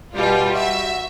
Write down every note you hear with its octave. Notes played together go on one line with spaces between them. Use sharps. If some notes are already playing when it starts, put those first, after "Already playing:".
B2 G3 F4
F#4 E5